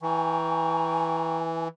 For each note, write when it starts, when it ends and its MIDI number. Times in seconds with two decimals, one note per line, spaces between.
0.02 1.68 52
0.02 1.38 79
0.02 1.66 80
0.02 1.38 82
0.02 1.38 85